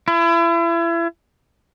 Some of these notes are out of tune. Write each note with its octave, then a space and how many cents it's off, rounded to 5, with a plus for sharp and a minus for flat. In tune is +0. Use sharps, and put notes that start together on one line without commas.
E4 +35